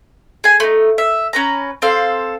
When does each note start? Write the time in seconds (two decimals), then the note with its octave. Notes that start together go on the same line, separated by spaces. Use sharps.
0.44 G#4 G#5
0.60 A3 D#4
0.98 E5
1.33 C#4 B4 A#5
1.82 C4 A4 F5